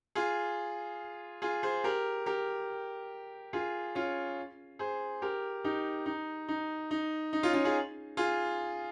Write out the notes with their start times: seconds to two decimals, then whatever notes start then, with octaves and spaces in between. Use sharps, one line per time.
0.15 F4 G#4
1.42 F4 G#4
1.63 G#4 C5
1.84 G4 A#4
2.26 G4 A#4
3.53 F4 G#4
3.95 C#4 F4
4.79 G#4 C5
5.22 G4 A#4
5.64 D#4 G4
6.06 D#4
6.48 D#4
6.91 D#4
7.33 D#4
7.43 C#4 F4
7.54 C#4 F4
7.65 F4 G#4
8.17 F4 G#4